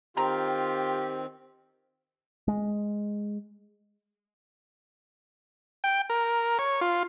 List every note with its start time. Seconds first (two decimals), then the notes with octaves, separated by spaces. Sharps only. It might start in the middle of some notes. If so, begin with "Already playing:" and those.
0.17 D#3 C4 F4 G4 A#5 C6
2.48 G#3
5.84 G5
6.10 A#4
6.59 C#5
6.81 F4